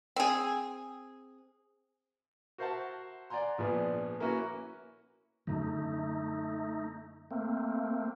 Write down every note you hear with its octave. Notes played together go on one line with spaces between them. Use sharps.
C4 G#4
F#4 A#4 C5 E5 F#5 A5
D5 F#5 G#5 A#5 C6
A#1 F3 B3 G#4 D5
A#3 C#4 E4 F#4 B4
F#2 D3 F#3 A3 D#4
A3 A#3 C4